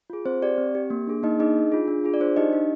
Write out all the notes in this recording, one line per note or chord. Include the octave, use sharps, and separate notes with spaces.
F4 G#4
C4 C5
G4 D5
C4
G4
A#3
D4 G#4
A#3 D#4 D#5
D4 D#4 G#4 D#5
D4
F4 G#4
D4
F4 G#4
D5
D4 C5
D#4 G4 D#5
D4